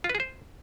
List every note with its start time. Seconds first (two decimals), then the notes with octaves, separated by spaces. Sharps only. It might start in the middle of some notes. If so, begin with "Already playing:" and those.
0.04 F4
0.09 B4
0.15 G#4
0.20 C5